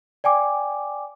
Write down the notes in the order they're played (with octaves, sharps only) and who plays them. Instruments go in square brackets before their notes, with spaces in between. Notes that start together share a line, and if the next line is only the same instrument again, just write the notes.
[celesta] D5 G5 G#5 D6